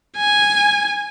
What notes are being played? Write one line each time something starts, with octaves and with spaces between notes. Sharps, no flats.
G#5